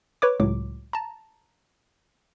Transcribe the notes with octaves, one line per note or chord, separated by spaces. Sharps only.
B4 C#5 D6
C#2 A2 F#3 D6
A5 A#5